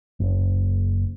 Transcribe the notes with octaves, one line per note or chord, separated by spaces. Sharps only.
F#1